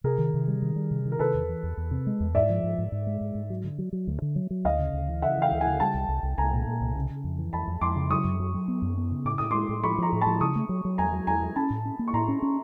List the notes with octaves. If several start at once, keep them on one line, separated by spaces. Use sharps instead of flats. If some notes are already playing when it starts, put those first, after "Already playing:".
C3 G#4 A#4
D#3
C3
G3
D#3
G3
C3
D#3
A#4
C3 A4 B4
E2
E3
E2
E2
C3
G#3
E2
G#2 D5 E5
F3
G#2
G#2
G#2
G#3
G#2
G#2
F#3
D3
F#3
F#3
D2
D3
F#3
F#3
D2 D#5 F5
C#3
D2
E3
C#3 E5 F#5
E3 F5 G5
D2
F#5 G#5
C#3
G3 G5 A5
C2
C2
C2
C2 G#5 A#5
A#2
A#2
C2
C#3
C#3
F2
E3
F2 A5 B5
F2
F2 C6 D6
C#3
F#3 C#6 D#6
F#2
F#3
F#3
B3
F#2
B3
C#3
A2 D6
A2 D#6
G#3 C6 D6
A2
F3 B5 C#6
F3 A#5 C6
A2
A5 B5
F3
C#3 C#6 D#6
A3
F#3
F#3
E2 G#5 A#5
F#3
E2 G#5 A#5
F#3
C#4 A5 B5
A2
C#4
A#3
C#6
A2 A#5 C6
C#4
C#4